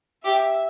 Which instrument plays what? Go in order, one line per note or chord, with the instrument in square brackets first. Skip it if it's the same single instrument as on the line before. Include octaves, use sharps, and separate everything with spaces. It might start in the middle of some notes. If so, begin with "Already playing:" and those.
[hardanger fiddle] G4 [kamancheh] E5